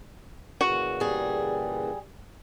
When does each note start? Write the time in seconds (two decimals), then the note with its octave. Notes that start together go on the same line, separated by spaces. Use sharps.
0.61 A#2 C#3 E3 F#4
1.00 G3 G#4